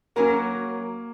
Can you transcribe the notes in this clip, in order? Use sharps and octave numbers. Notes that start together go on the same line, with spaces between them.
F#3 A#3 C#4 F#4 A#4